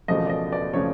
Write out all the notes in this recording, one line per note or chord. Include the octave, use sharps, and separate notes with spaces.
E1 E2 C#3 F3 A3 D#5
D5
D#5
D5
C#3 F3 A3 C#5